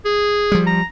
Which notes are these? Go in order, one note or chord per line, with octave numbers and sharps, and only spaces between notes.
G#4
F3 G3
A#5